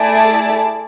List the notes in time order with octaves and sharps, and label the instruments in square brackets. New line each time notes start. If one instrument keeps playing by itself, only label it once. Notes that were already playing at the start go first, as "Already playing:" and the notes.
Already playing: [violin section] A3 E4 G#4 D5 A5